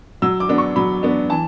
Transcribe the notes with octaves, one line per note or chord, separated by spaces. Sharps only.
F#3 E6
D6
B3 D4
C#6
F#3 B5
B3 D4
E3 A5